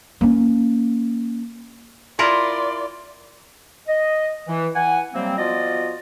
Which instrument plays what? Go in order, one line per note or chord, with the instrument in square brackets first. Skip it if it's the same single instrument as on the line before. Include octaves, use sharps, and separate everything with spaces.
[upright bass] A#3 C#4
[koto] E4 F4 A#4 [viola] D5 C6
[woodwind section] D#5
E3
E3 F#5 G#5
C3 F#3 G3 A#3 C4
F3 B3 F4 F#4 D5 D#5